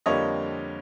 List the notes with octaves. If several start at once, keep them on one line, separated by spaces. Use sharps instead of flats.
F2 D3 G3 A#3 C#5 D#5